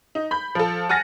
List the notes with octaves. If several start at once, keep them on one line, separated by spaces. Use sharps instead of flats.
D#4
B5 G6
F3 A4
F#5 G#5 F6 A6 A#6